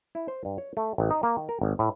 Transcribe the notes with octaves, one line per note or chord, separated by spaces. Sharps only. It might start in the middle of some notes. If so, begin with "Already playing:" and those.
E4
C5
G2
C#5
A3
A1
D#4
A#3
D#3
A#4
G#1
A2